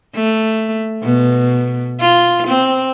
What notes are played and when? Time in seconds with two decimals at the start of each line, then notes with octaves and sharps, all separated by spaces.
0.15 A3
1.03 B2
2.01 F4
2.48 C4